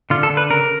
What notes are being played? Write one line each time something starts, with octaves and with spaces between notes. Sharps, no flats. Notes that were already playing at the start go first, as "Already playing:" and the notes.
D3 F4
A4
D3
B4
C#3 A#4